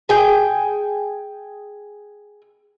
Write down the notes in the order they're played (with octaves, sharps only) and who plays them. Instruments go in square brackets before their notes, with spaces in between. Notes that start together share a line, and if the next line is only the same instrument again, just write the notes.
[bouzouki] G#4 G5